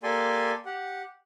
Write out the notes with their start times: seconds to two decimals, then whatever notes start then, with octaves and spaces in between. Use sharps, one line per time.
0.03 A#3 G4 A4 D5 G#5 C6
0.66 G4 F#5